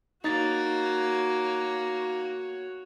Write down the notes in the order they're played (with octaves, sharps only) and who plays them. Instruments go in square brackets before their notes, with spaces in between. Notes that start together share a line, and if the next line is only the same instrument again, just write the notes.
[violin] A#3 [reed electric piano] D#4 A6 [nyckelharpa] F#4 C#5